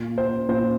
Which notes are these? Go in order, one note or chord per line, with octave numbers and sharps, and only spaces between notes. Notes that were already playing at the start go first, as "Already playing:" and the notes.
Already playing: A#2
C5
A#2 C5